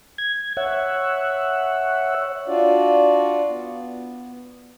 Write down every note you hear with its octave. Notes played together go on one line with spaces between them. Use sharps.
G#6
C#5 E5 F#5
D4 F4 F#4 D5
B3